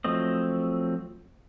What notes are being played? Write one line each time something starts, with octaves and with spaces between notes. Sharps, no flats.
F3 F#3 A3 C4 D#5